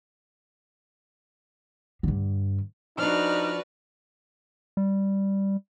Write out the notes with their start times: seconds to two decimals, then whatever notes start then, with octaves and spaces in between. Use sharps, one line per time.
2.03 G2 D3
2.98 F3 D4 D#4 F#4 B4 D5 F6
4.77 G3